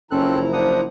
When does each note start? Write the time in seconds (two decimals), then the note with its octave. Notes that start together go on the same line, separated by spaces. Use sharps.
0.11 F#1 F3 C4 C#4 E4 A4 A#5 F#6
0.53 D4 C5 F#5 D#6